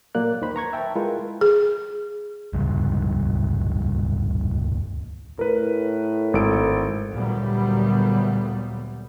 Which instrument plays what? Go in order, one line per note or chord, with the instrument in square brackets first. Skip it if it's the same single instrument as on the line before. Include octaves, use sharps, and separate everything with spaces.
[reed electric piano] A#2 F#3 A#3 D5 F#6
D#2 D#3 C5 B5
B4 A#5 C#6 G#6
E5 G5 A5
G#3 E4 F4 A#4 B4
[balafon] G#4
[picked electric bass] D#1 C#2 G2
[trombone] A2 [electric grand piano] A#4 B4
[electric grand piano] G#1 A4 D7
[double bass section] D2 A#2 F#3 G3 B3